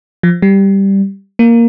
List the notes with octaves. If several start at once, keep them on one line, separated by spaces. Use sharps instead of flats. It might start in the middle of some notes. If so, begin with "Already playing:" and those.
F3
G3
A#3